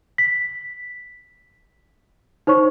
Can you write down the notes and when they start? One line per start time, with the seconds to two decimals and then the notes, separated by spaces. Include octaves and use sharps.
0.18 B6
2.47 D#4 C5 C#5 C#6